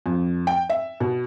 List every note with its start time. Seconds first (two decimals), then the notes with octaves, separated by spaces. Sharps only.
0.06 F2
0.47 G5
0.70 E5
1.00 B2